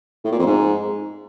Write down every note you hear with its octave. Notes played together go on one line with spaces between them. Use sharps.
A2
A#2
F2
G#2